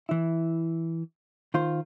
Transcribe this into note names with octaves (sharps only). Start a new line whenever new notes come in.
E3 E4
D#3 F4 C5